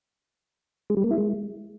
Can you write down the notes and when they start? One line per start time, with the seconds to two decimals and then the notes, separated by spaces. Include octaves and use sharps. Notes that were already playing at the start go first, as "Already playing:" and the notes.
0.90 G#3
0.97 G3
1.04 A#3
1.11 E4
1.18 G#3